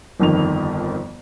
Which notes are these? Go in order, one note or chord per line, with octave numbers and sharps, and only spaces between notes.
G1 F2 D#3 F3 F7